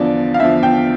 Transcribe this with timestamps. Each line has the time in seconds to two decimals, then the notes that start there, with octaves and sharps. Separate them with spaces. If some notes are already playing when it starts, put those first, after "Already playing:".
Already playing: E2 D3 F3 D5
0.34 F5
0.40 E2 D3 F3 E5
0.63 G5